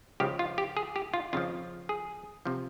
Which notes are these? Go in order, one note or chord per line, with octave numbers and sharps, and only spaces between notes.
C#2 C#3 F3 G4
F4
G4
G#4
G4
F4
F2 C#3 F3 F4
G#4
C3 F3